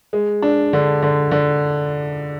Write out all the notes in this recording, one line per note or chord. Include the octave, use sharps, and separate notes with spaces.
G#3
D4
D3
D3
D3